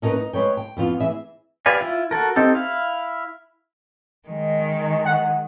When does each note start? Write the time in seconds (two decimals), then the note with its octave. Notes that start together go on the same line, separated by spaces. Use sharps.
0.02 C#4 D#4 F#4 A#4 B4
0.16 D#4
0.33 G#3 B4 C#5 G5
0.57 G5
0.77 F2 B3 F4
1.00 E3 G#4 E5
1.66 G4 B4 D5 F5 G#5
1.81 E4 F4
2.11 F#4 A4 A#4
2.36 C4 D#4 G4 A4
2.55 E4 F5
4.28 D#3 G#3
5.05 F#5